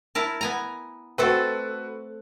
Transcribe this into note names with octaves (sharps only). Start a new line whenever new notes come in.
E4 A#4 A5
B3 G#5 A#5
A3 C4 F#4 A4 B4